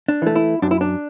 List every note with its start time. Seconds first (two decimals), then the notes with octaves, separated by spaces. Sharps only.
0.08 D4
0.22 E3 A3
0.36 E4
0.62 F#2 D4
0.71 E4
0.81 D4